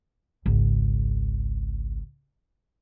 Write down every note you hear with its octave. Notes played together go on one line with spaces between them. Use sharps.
G#1 C#2